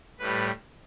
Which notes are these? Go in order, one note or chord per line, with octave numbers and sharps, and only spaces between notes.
A2 G3 B4